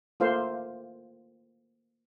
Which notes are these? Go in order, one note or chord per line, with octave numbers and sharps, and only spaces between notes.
A3 A#3 F4 C5 F5